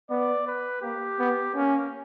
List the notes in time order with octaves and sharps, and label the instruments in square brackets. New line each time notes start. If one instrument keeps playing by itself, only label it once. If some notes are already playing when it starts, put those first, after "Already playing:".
[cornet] B3 [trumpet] D5
[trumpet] B4
[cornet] A#3 [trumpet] G4
[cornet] B3
[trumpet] A#3 [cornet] C#4